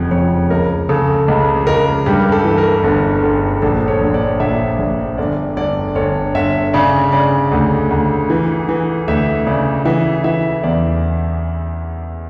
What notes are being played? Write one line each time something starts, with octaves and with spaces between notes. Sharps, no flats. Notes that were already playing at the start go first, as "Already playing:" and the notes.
Already playing: F1 F2 C#3
F2 C#5
C#2 A#4
C#3 A4
C#2
C#2 A#4
G2 G4
A4
E3
A#4
G1
G1
A#1 A4
C#5
A#1
D5
A#1 E5
A#1
G1 D5
G1 D5
G1 C#5
G1 E5
C#3 D5
C#3 D5
D2
D2
E3
E3
D2 E5
C#3 D5
E3 E5
E3 E5
E2 D5